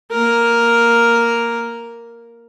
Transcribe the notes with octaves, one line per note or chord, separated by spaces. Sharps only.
A#3 A#4